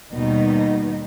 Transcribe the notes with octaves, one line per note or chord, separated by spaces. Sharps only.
D#2 B2 D#3 G3 B3 D#4